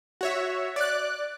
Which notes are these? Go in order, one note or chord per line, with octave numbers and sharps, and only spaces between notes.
F#4 C#5 E5
D5 F#6